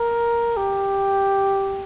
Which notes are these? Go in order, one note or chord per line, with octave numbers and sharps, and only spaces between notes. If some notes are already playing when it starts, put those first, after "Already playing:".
Already playing: A#4
G4